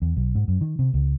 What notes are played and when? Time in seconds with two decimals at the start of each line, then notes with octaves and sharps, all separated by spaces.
0.02 E2
0.16 B1
0.35 G#2
0.48 F#2
0.61 D#3
0.79 C3
0.94 C#2